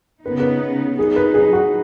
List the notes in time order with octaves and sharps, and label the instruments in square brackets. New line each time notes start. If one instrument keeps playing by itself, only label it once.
[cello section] C#3 B3 D#4 [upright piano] B4
[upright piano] B4
[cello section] F#3 D#4 [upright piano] G#4
[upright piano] B4
G#4
F#4